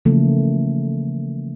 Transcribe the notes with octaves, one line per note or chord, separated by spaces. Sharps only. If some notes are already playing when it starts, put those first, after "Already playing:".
C#3 E3 F3 A3 A#3